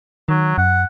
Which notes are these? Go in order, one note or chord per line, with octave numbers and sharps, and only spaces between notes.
D#3 F#3
F#2 F#5